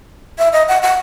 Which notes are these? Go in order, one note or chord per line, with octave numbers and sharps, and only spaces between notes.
E5
D#5
F#5
F#5